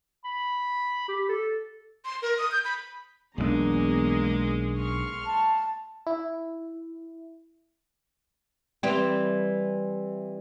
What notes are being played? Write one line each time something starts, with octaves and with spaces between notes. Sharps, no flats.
B5
G4
A4
C6
A#4
D#6
G6
B5
B1 E2 F#3 G#3 A#3 D4 G#4 A#5
C6 C#6 F6
A5
E4
E3 G3 C4